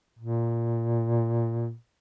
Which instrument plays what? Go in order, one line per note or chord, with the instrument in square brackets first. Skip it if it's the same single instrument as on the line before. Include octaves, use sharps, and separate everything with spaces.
[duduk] A#2